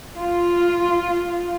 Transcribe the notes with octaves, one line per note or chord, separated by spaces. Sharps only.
F4